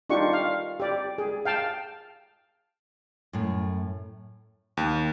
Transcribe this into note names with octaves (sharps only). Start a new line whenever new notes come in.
D4 D#4 F4 G4 C#6
F5
G4 D5
G#4
F5 G5 A5
F#2 A2
D#2